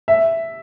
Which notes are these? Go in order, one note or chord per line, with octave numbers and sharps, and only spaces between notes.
E5